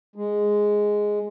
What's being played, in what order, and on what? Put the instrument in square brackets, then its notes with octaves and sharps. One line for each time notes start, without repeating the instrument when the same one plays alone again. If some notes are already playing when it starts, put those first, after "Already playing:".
[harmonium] G#3